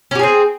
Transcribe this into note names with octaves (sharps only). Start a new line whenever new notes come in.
C4 C#4 G4 G#4